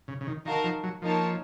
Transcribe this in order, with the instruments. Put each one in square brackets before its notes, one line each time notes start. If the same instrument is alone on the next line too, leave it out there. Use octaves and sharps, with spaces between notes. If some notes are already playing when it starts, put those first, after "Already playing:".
[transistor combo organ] C#3
C#3
D#3
[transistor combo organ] D#3 [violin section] D#4 F#4 A#4 F5 A5
[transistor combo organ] F3
F#3
[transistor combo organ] F3 [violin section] A#3 D#4 A#4 C#5 A5